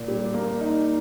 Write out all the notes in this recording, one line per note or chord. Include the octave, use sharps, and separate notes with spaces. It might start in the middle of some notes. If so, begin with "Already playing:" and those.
Already playing: A#2
G3
A#3
D#4